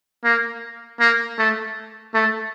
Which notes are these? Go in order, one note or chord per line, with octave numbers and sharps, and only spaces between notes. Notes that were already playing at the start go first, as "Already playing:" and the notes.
A#3
A#3
A3
A3